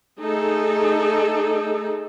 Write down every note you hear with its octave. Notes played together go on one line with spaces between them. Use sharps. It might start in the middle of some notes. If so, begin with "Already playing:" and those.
A3 D#4 G#4 A4